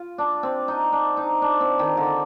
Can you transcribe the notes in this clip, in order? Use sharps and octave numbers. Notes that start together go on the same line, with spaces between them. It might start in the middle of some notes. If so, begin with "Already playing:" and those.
Already playing: F4
D4
C4
D#4
D4
D#4
D4
C4
D#3
D3